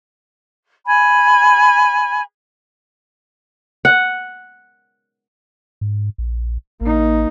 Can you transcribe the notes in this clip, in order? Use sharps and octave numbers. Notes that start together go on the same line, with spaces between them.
G#5 B5
F#5
G#2
A#1
A1 A#3 D#4